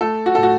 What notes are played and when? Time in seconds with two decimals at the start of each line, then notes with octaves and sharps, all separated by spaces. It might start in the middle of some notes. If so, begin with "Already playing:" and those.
0.01 A3 A4
0.26 F#4
0.35 A2 A4
0.43 F#4